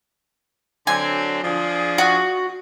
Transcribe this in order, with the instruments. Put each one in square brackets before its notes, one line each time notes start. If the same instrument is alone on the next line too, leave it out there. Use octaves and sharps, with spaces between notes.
[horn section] D3 F#3 C4 [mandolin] G#5
[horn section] F3 D4 G#4
[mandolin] F#4